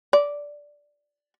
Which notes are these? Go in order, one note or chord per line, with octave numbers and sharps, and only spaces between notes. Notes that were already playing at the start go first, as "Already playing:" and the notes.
D5